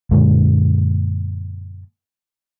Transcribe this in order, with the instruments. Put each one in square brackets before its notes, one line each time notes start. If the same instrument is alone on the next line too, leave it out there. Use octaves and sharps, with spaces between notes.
[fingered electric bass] F#2 A#2 D3 G#3